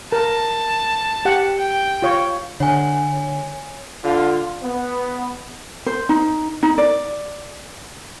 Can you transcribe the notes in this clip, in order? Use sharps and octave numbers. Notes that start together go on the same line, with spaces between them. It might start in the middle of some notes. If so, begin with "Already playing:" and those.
A#4 A5
G4 F#5
G5
F4 C#5
D3 C#5 G#5
D3 F4
B3
C5
D#4
D#4
D5